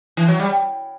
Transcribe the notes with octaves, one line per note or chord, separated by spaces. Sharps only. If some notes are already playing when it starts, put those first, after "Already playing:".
E3
F#3
G3